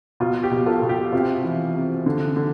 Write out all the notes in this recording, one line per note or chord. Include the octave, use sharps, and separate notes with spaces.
B2 F4
G4
B2
F4 A4
B2
G4
C3 F4
E3
C3
D3
D3